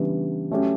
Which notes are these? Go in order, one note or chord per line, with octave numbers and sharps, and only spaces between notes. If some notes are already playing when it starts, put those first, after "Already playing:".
Already playing: C#3 E3 G3 B3 D4
F#3 A3 C#4 G4